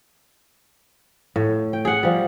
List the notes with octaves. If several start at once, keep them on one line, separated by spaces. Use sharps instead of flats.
A2
G5
G#4 F#5
F3 G3